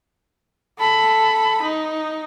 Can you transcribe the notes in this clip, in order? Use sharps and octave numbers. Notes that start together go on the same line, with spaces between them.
A4 B5
D#4